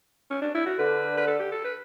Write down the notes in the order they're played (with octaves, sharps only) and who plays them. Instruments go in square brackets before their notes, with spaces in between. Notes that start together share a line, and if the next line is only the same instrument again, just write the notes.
[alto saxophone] C#4
D4
E4
F#4
[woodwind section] D3 [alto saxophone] B4
[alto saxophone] B4
A4
G4
A4
B4